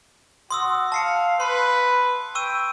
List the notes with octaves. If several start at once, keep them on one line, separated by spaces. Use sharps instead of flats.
F#4 C6 D#6 E6
F5 A5 C7 C#7
B4 C6 C7
G5 C#6 E6 D#7